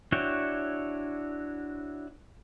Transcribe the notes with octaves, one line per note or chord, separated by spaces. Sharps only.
D4 E4 F#4 C#5 G5